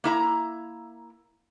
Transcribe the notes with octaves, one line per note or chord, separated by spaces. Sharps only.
A#3 E4 A#5